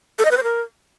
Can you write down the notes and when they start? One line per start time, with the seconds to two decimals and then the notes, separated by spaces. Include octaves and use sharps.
0.19 A4
0.25 D#5
0.31 B4
0.37 C5
0.43 A#4